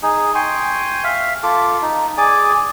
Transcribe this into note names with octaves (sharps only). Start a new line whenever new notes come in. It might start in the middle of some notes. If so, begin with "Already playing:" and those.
D#4 G#4
G5 G#5 C6 C#6
E5 F5
F4 A4 D6
D#4
G#4 D5 G#5 D6